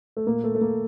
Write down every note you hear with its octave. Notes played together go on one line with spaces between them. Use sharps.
A3
A#2 A#3
A3
A3
A#3